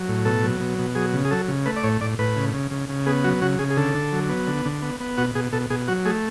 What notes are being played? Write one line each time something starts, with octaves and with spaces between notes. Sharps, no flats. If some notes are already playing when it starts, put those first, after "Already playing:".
Already playing: F#3
A2
B2 A4
F#3
B2
B2
F#3 G#4
C#3
G#4
F#3 A4
C#3
A3 B4
D5
A2 C#5
A2 D5
A2 B4
C#3
C#3
C#3
C#3
B3 G#4
F#3 F#4
C#3 F#4
C#3 G#4
G#4
D3 A4
D3
F#3
B3
D3
D3
B3
B3
B2 F#4
B2 G#4
B2 A4
B2 G#4
F#3 F#4
A3 G#4